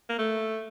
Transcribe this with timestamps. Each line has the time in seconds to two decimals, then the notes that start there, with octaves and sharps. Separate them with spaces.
0.09 A#3
0.18 A3